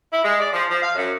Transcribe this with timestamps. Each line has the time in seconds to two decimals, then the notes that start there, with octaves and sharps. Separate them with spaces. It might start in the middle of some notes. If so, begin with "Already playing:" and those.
0.12 E4
0.24 G#3
0.40 D5
0.53 F3
0.69 F3
0.82 F5
0.95 F#2